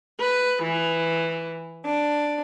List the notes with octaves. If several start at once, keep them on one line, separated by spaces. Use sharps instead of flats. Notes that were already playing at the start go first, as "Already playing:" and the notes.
B4
E3
D4